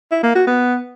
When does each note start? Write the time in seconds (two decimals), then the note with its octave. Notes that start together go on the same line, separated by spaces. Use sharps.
0.11 E4
0.23 A#3
0.35 F#4
0.47 B3